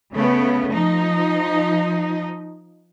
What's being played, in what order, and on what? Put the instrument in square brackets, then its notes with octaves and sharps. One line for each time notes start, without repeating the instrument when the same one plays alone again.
[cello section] C#3 A3 B3
F3 D#4